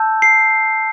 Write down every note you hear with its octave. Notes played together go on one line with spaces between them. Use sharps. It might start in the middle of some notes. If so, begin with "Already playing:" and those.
Already playing: A5 E6 G6
C7